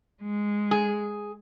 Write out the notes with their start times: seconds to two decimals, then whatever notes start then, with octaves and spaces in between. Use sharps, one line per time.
0.22 G#3
0.71 G#4